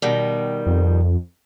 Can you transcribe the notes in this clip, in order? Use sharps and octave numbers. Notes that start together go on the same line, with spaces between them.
B2 D#3 G3
F2